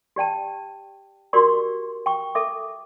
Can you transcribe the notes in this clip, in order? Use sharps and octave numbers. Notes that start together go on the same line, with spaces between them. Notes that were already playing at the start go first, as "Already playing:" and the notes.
G4 D5 G5 A5
F#4 G4 A#4 D5 C6 C#6
G5 C#6
A4 E5 D6